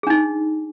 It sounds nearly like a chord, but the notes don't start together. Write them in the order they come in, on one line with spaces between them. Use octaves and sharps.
G#4 D4 D#4